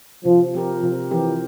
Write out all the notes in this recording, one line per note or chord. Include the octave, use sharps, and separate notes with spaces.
C3 F3
F3 C4 G4 A#4
C3 F3
E3 F3 C4 G4 A#4